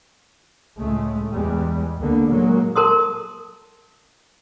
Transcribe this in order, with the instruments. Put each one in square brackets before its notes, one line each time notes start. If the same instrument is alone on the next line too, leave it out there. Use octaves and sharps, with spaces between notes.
[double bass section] C#2 A2 G#3 A3
E2 G3 G#3
D2 D3 A#3 B3
A#2 F#3 G#3 A#3
[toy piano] A#4 A5 C6 D#6